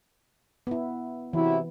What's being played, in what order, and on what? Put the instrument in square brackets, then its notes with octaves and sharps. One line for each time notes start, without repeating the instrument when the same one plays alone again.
[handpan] B3 E4
[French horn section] C3 F#3 E4 [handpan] E3